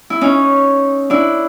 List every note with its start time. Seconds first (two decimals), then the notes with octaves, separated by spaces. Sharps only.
0.10 E4
0.21 C#4 D#4
1.10 D4 E4